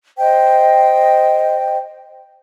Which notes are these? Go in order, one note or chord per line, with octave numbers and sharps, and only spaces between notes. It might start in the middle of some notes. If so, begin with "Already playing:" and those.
C5 D#5 G5